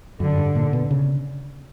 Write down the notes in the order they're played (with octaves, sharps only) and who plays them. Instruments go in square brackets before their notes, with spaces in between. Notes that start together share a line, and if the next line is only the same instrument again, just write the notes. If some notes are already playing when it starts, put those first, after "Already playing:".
[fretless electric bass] F#2 [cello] D3
[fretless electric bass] G2
A#2
B2
C#3